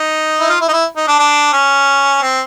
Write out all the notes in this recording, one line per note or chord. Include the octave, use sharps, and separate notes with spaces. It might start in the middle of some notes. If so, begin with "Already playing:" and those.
Already playing: D#4
E4
F4
E4
D#4
E4
D#4
D4
D4
C#4
C4